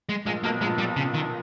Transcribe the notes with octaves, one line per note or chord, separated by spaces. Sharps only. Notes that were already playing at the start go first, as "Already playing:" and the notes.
G#3
A#1 A#2 G#3
B1 B2 A#3
A#1 A#2 G#3
G3
C#3
D#3